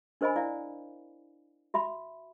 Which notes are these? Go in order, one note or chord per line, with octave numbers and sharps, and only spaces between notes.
D4 A#4 C5 D#5 G#5 B5
E4 D5 F5
F#4 E5 B5